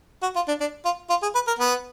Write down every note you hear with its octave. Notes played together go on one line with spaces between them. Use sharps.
F#4
F4
D4
D4
F4
F4
G#4
B4
A#4
B3